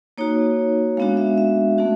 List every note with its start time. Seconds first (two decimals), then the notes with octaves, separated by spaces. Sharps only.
0.18 A#3 D#4 F#4 C#5
0.97 G#3 B3 D4 F#4 F5
1.17 E5
1.38 E5
1.78 A3 C#4 F#4